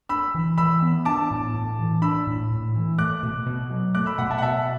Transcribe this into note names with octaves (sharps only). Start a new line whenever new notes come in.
D4 B5 E6
E3
E3 B5 E6
B3
D4 A5 D6
A2
A2
E3
D4 B5 E6
A2
A2
E3
A3 D6 F#6
B2
B2
F#3
A3 D6 F#6
B5 E6
B2 F#5 B5
E5 A5
F#5
B2 E5 A5